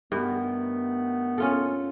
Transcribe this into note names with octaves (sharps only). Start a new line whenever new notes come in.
G2 D#3 A3 B3
C#4 F4 A4